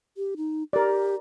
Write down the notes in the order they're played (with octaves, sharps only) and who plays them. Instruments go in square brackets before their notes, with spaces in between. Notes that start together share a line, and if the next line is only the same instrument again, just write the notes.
[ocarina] G4
D#4
[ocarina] G4 [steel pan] A#4 D5